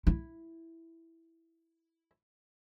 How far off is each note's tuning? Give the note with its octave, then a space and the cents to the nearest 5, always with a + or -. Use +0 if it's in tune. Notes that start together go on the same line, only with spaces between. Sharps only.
E4 +0